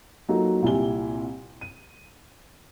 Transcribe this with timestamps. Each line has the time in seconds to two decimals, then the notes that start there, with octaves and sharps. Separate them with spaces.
0.29 F#3 A#3 D#4 F4 F#4 A4
0.62 C2 A#2 E4 G4 G#5 G7
1.61 D#7